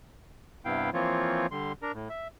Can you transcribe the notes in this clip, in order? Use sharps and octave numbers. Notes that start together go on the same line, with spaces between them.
G2 C3 B3 E4 F5 G5
E3 F3 A#3 C4 F4 C#5
D3 G3 C6
D4 A#4 A#5
A2
E5